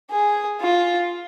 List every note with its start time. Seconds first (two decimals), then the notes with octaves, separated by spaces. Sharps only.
0.11 G#4
0.61 F4